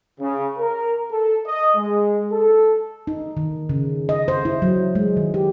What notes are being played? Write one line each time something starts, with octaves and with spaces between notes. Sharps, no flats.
C#3
A#4
A4
D#5
G#3
A4
D#4
D#3
C#3
D#5
C5
E4
F#3
G#3
D#3
G4